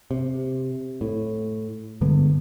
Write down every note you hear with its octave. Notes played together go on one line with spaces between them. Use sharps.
C3
A2
G2 D3 G#3 B3